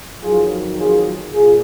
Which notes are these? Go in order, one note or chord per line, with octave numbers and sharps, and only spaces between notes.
F2 D#3 F#3 F4 G#4
F4 G#4
A#2 F4 G#4